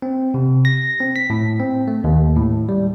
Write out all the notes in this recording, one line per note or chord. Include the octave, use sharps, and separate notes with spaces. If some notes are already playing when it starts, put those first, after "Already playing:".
C4
C3
A#6
C4
B6
A2
C4
A3
D#2
A2
G3